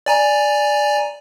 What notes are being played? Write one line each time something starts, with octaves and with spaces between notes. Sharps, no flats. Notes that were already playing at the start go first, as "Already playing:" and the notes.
D5 G#5 A#5